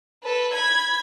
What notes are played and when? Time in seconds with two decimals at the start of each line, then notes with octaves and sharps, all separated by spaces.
0.24 A4 B4
0.53 B5 G#6